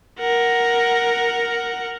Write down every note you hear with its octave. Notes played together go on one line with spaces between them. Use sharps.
A#4 F#5